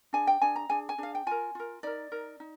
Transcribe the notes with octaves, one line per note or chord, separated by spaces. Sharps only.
D4 G#4 G#5
G5
D4 G#4 G#5
A#5
D4 G#4 G#5
G#5
D4 G#4 F5
G5
F4 A#4 G#5
F4 A#4
D#4 A#4 D5
D#4 A#4
D#4